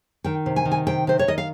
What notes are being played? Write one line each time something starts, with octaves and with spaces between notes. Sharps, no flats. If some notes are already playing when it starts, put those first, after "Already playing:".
D#3 G5
C3
G#5
D#3
G#5
C3 G5
C3 C5
C#5
D#3 D#5
F5